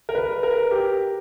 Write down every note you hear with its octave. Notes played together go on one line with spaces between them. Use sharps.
A#4
B4
A#4
G4